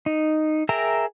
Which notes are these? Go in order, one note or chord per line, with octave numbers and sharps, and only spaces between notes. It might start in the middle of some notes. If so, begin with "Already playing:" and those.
D#4
G#4 A#4 E5 G5 A#5